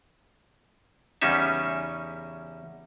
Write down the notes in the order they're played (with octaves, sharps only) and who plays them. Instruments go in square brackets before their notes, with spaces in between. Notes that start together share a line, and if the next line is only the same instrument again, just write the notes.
[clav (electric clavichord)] E2 C#3 G3 C#4 D#4 E5